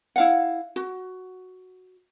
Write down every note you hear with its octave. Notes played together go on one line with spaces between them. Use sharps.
E4 F5 F#5
F#4